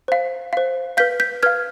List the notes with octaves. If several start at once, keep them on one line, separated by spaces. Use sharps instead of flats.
C5 F5
C5 F5
B4 F5 G6 B6
G6 B6
B4 F5 F6 G#6